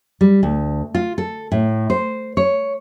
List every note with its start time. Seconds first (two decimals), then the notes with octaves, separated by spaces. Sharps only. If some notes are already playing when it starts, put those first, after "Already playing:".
0.21 G3
0.43 D2
0.95 F4
1.18 A4
1.52 A2
1.90 C5
2.37 C#5